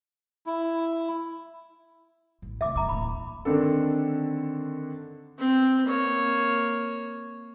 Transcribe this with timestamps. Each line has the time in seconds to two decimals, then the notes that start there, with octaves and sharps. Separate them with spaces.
0.46 E4
2.42 A1
2.61 D2 C3 E5 D6
2.76 F1 E2 A#5 D6
2.89 D1 A#2 B5
3.45 D3 D#3 C4 D4 A4
5.39 C4
5.86 A#3 C#5